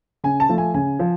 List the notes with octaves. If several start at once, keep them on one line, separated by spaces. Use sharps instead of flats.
C#3 G#5
A5
F3 A3
G#5
C#3 G#5
F3